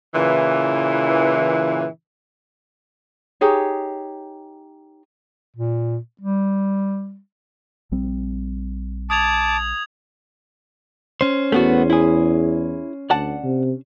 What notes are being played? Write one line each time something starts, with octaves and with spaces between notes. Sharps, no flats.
A#2 C#3 E3
D#4 G4 G#4 C#5
A#2
G3
A#1 G3 C4
A5 D6 D#6 G#6 F7
C#4 C5
E2 A3 B3 F#4
E4 G#4
D2 D5 F#5 A5
C3